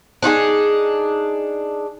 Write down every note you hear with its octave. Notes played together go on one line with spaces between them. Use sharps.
D4 D#4 F4 G#4